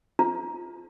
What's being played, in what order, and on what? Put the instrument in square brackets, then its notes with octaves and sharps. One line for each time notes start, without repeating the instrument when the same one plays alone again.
[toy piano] F4